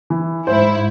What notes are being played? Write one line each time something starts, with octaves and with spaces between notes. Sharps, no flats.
E3
G#2 E4 C5